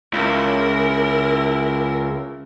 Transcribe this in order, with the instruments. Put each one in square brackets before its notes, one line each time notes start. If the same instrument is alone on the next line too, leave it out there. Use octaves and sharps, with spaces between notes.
[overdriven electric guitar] C#2 [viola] E4 A#4